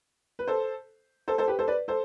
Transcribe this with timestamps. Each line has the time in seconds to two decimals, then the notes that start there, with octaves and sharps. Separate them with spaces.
0.39 B4
0.48 A4 C5
1.28 A4 C5
1.38 A4 C5
1.48 G4 B4
1.59 A4 C5
1.68 B4 D5
1.88 A4 C5